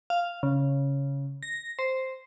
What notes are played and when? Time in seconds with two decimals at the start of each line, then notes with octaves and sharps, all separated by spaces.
0.10 F5
0.43 C#3
1.43 A#6
1.79 C5